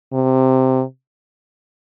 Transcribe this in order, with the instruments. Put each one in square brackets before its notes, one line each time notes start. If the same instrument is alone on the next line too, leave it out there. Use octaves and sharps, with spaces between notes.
[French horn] C3